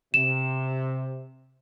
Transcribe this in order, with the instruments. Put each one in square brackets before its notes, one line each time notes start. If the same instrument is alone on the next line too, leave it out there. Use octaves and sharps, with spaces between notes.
[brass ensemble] C3 [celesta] E7